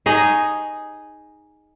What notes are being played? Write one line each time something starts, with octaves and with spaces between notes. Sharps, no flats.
D#4 G#4 C#5 D#5